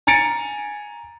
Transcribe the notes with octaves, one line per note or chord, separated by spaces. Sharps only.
G#5 A#5 A6 C#7 D7